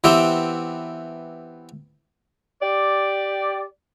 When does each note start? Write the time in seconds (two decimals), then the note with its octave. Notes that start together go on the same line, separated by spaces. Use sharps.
0.04 E3 B3 C4 G4 E5
2.62 G4 D5